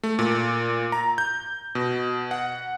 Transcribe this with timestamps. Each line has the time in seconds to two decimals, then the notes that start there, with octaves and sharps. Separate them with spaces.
0.03 A3
0.19 A#2
0.92 A#5
1.18 G6
1.75 B2
2.31 F#5